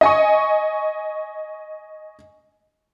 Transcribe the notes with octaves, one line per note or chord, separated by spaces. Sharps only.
D#5 G#5 C#6